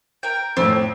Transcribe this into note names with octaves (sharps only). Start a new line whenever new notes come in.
A#4 G5
F2 A2 C4